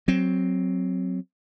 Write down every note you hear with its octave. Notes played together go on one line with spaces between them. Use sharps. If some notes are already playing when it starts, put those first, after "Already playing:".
F#3 C4